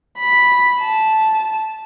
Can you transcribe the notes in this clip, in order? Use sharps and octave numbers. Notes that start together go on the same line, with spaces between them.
B5
A5